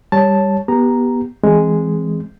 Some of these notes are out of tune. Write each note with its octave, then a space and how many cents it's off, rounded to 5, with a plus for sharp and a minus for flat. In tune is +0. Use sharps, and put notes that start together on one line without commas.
G3 +15 C#5 +0 A5 +0
B3 -20 G4 +0 A#5 +0
E3 +0 G#3 +0 C4 +0